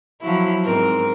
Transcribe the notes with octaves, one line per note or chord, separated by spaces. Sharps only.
F3 F#3 E4
G#2 C4 A#4